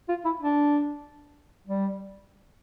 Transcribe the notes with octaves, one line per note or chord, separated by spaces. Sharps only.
F4
E4
D4
G3